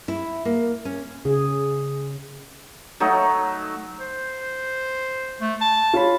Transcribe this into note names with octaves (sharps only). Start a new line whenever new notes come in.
E4
A#3
C#4
C#3 G#4
F#3 A3 D#4
C5
A3
A5
F4 C#5 B5